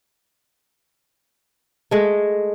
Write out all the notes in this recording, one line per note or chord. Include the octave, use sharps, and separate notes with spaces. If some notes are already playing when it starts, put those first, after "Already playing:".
G#3 A3